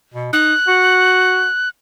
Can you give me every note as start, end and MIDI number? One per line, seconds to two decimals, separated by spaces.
0.14 0.29 47
0.33 0.54 63
0.33 1.69 90
0.68 1.48 66